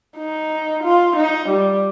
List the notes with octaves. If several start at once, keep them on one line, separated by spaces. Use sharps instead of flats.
D#4
F4
D#4
G3